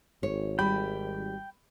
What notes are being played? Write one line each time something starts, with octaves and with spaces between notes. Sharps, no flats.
G#1 C#5
G3 G5 B5